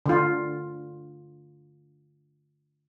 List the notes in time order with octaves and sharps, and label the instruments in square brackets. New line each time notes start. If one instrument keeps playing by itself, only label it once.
[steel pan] D3 F4